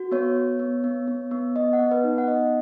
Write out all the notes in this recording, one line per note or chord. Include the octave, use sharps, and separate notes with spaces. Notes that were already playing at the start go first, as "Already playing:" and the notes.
Already playing: F#4
B3 C#5
B3
B3
B3
B3
B3
B3 D#5
F#5
B3
B4
D#4
F#5
B3 D#5